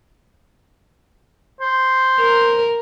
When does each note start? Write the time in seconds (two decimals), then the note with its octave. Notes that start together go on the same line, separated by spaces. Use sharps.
1.60 C5
2.20 A#4